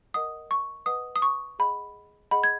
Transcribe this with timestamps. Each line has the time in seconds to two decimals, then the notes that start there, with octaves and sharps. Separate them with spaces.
0.14 A#4 D#5 F#5 D#6
0.51 C#6
0.86 B4 D#5 F#5 D#6
1.16 D#6
1.22 C#6
1.59 G#4 D#5 F#5 B5
2.31 G#4 D#5 F#5 B5
2.43 G#6